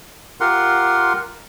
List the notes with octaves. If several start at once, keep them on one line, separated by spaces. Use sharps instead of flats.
F4 G4 A#4 F#5 C6